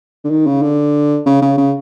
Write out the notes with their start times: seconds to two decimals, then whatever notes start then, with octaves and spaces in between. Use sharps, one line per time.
0.24 D3
0.30 D#3
0.47 C#3
0.62 D3
1.26 C#3
1.42 C#3
1.57 C#3